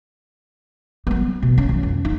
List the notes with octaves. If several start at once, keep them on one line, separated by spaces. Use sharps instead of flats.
F#3 B3
B2
C#4
E3
F2
D#4